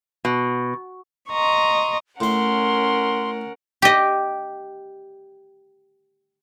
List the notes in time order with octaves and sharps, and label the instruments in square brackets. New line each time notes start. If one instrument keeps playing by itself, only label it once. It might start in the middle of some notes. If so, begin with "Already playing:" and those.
[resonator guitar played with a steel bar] B2
[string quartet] D#5 A#5 C6 C#6
[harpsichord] A2 B5 [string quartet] C#4 A#4 F#5 [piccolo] C6
[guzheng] G4 D#5